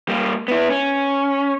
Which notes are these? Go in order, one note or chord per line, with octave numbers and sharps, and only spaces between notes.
G3 A#3
B3 E4
C#4